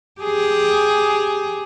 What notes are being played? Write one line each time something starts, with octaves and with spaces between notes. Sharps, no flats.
G4 G#4